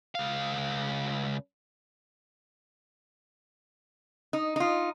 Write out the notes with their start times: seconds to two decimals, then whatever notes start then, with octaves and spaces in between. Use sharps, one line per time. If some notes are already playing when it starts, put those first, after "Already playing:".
0.15 C#2 F5
4.33 D#4
4.56 D#4 F4